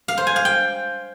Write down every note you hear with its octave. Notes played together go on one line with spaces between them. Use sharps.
F5
C5
G#5
F5
G5